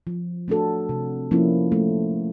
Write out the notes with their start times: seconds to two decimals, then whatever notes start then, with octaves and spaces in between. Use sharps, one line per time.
0.07 F3
0.48 A3 D4 F#4 A4
0.89 C3
1.31 F3 A#3 C#4 E4
1.72 A3